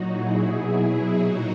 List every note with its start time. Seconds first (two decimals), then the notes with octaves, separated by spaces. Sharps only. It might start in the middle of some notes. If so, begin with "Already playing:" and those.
Already playing: A#2 F#3 D#4 F#4
0.09 E4 G#4
0.44 B2 F#3
1.15 A#2 F#3 D#4 F#4